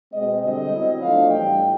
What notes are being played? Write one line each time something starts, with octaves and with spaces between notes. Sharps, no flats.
B2 G#3 C4 D#5
D3 G3 C4 D#5
F#3 B3 E4
F3 A3 D4 F5
A2 E3 G3 G5